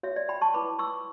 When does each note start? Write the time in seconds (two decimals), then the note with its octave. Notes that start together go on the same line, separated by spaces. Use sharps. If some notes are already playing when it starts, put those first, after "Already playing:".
0.03 F#4 C#5 E5
0.16 D5
0.29 G5 B5
0.41 A5 C#6
0.54 E4 B4 B5 D6
0.79 C#6 E6